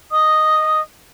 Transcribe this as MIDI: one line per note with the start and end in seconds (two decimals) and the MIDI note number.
0.11 0.80 75
0.11 0.80 87